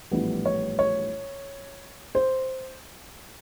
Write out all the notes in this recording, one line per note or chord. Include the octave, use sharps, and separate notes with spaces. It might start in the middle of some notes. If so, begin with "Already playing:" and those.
A#1 A2 E3 G3 B3
C#5
C#5
C5